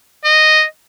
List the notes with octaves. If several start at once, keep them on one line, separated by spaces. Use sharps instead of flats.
D#5